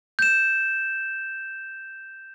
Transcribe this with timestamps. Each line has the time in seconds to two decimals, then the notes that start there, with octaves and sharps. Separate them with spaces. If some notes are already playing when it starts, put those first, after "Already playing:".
0.19 G6 E7